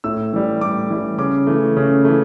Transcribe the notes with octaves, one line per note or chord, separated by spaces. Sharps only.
A2 E6
E3 G3
A2 D6
E3 G3
C#3 D6
E3 A3
C#3
E3 A3